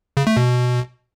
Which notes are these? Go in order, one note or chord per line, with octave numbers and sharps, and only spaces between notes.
C#3
A3
B2